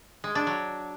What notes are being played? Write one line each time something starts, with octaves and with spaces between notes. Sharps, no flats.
G#3
D4
F#3